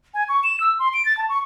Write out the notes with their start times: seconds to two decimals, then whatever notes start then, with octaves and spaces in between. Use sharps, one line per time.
0.14 G#5
0.29 C#6
0.44 E7
0.60 E6
0.79 C6
0.94 D7
1.05 A6
1.17 A5
1.29 C#6